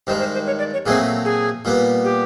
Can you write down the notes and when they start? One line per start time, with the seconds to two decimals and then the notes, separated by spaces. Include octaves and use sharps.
0.07 G2 D#3 G#3 C5
0.20 C5
0.34 C5
0.47 C#5
0.59 D5
0.73 C#5
0.85 A#2 F#3 A3 C4 G#4
1.25 G#4
1.65 A#2 G3 B3
2.04 G4